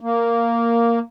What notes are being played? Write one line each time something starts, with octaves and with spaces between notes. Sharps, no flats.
A#3